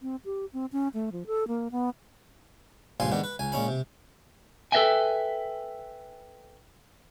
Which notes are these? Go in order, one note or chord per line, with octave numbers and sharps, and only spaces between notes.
C4
G4
C4
C#4
A3
F3
A4
A#3
B3
C#2 G2 A#2 F3 G#5 C6
G#2 D#3 B3 D4
B4
C#2 G#5
A#2 G#3 C#4 B5
C3
A4 B4 D#5 E5 G5 G#5